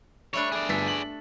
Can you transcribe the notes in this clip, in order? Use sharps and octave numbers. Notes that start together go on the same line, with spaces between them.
G3 A3 D4 C#5
G#4 D5
G1 A4 B6
F#7